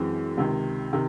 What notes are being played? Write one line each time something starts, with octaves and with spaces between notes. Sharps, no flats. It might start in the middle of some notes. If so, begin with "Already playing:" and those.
Already playing: F#2 E3 G#3 C4
C#2 C3 D#3
C3 D#3